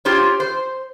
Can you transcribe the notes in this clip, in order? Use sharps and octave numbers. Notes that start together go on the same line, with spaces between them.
F4 G4 C5 C#5
C5